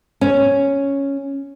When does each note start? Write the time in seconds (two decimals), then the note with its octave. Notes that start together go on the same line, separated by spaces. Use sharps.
0.21 C#4